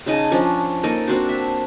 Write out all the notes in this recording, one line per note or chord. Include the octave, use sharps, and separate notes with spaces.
C#3 D#4 D#5 A5
F3 C#4 D4
A#3 D#4 A4 D#5
C4 D4 F#4 C5
E5